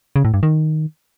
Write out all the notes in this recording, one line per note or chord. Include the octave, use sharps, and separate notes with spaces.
C#3
A2
G2
D#3